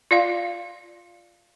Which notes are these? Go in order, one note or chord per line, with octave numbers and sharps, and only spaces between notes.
F4 D5 F5